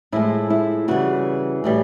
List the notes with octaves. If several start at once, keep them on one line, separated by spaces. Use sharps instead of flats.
A2 F3 G#3 E4
E4
C#3 E3 G3 F#4
A2 E3 G3